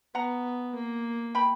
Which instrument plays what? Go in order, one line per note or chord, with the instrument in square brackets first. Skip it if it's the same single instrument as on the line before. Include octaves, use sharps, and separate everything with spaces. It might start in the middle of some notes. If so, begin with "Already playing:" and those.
[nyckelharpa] B3 [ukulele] F#5 A#5
[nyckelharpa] A#3
[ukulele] G5 B5